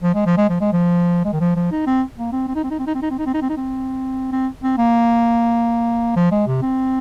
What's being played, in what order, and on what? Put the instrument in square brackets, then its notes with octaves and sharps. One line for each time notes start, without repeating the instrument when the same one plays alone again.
[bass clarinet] F3
G#3
F3
G#3
F3
G#3
F3
G#3
D#3
F3
F3
D#4
C4
A#3
C4
C4
D#4
C4
D#4
C4
D#4
C4
D#4
C4
D#4
C4
D#4
C4
D#4
C4
C4
C4
A#3
F3
G#3
C3
C4